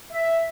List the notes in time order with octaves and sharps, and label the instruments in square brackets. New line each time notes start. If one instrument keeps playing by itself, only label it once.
[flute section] E5